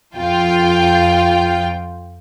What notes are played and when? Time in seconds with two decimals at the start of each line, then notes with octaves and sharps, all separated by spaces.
0.15 F2 F4 G5